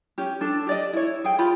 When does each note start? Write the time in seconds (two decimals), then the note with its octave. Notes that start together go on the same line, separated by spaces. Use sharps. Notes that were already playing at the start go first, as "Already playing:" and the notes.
0.18 C#4 G4
0.41 D4 A4
0.67 G4 D5 D#5
0.93 E4 C#5
1.24 G#4 G5
1.39 F4 G4 B5